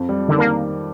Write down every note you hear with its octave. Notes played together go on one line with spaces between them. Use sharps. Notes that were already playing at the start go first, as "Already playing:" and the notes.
Already playing: F2
G3
D3 D#3
A#3